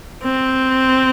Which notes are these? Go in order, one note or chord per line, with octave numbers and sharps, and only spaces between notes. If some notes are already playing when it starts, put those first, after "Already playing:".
C4